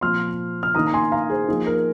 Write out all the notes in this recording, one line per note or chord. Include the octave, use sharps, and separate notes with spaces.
A#2 F3 C4 C6 F6
F6
D#3 A#3 D#4 A#5 D#6
A#5
G#5 C6
F5 A#5
G#4 C5
F3 A#3 D#4 G#4
A#4